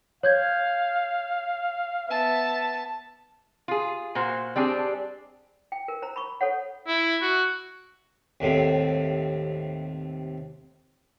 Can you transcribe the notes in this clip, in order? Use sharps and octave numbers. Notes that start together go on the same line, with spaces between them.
C#5 F5 G6 G#6
B3 E5 A5
F4 G#4
A#2 F#4 C5
G3 C4 D4 G#4
G5
A#4
C5 A#5
B5 C#6
A4 C5 C#5 F#5
E4
F#4
D#2 A2 C3